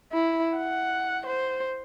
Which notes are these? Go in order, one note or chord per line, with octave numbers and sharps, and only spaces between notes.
E4
F#5
C5